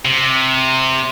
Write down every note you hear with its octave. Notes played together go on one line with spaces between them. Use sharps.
C3